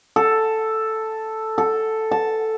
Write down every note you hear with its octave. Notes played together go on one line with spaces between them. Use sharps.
A4
A4
A5